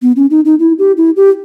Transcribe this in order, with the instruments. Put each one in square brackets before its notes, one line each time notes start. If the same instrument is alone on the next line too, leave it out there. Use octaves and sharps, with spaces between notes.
[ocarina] B3
C#4
D#4
D#4
E4
G4
E4
G4